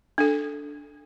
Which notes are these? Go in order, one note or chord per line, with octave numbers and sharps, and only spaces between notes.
D4 A4